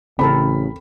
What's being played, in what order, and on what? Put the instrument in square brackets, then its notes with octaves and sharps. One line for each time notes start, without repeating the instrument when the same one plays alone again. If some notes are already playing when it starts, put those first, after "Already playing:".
[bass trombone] A1 [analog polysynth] C#3 [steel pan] C4 A4 A#4 [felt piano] B5